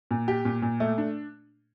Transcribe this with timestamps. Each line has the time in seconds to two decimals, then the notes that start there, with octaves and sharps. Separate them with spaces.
0.11 A#2
0.28 G4
0.45 A#2
0.62 A#2
0.80 A3
0.98 D4